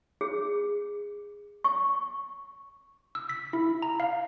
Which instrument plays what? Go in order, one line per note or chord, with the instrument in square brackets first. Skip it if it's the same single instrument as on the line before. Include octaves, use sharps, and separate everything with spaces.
[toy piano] G#4
C#6
[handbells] E6
B6
E4
A#5
F5